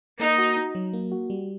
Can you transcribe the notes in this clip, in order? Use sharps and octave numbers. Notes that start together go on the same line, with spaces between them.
A#3 D#4
F#4
D#4
F#3
A#3
F#4
G3